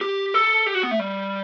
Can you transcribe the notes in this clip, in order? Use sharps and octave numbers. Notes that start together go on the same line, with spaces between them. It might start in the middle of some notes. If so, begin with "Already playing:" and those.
G4
A4
G4
F#4
B3
A3
G3